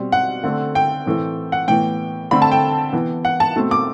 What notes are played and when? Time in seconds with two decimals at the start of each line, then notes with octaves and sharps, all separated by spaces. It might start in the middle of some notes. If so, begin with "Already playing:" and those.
Already playing: B2 G3 C4
0.12 F#5
0.44 D3 A3 C4
0.75 G5
1.06 A2 E3 A3 C4
1.52 F#5
1.68 A2 E3 B3 G5
2.31 D3 A3 C4 B5
2.42 A5
2.52 G5
2.93 E3 B3
3.25 F#5
3.40 A5
3.56 B2 A3 C4
3.71 D6